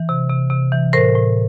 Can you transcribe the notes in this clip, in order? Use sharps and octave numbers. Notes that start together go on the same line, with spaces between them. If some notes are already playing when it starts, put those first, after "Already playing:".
Already playing: E3
C3
C3
C3
E3
A2 A#4 C5
A2